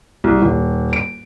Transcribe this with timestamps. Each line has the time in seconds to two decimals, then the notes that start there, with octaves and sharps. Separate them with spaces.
0.24 C2
0.42 D#1
0.93 D7